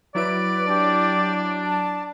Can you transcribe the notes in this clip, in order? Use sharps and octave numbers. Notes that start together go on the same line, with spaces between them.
F#3 E4 B4 D5 D7
D4 G4
A5